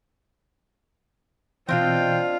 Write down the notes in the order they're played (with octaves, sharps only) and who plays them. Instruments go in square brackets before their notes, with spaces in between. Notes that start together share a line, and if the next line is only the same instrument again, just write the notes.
[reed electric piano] B2 E3 [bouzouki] C4 D4 D#5 [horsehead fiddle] F4 F5 [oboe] G5